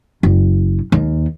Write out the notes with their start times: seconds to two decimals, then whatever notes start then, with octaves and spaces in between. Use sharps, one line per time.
0.23 F#1
0.92 D#2